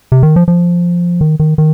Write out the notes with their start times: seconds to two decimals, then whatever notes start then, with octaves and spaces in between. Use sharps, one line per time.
0.12 C3
0.23 D#3
0.36 F3
0.48 F3
1.21 D#3
1.39 D#3
1.58 D#3